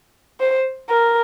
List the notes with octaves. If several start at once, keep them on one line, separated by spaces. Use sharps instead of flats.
C5
A#4